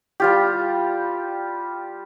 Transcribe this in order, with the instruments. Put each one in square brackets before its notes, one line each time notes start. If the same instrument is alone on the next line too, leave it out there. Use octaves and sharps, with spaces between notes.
[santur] G3 F4 G4